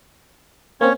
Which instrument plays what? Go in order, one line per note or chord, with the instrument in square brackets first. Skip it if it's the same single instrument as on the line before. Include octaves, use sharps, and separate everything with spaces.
[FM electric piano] A#3 C4 [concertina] C#4 C#5